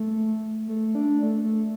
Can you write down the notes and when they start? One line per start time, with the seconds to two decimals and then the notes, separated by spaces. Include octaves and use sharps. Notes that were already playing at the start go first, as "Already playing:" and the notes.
Already playing: A3
0.68 A3
0.95 D4
1.23 A3
1.44 A3